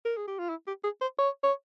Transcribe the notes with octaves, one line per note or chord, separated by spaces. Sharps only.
A#4
G#4
G4
F4
E4
G4
G#4
C5
C#5
C#5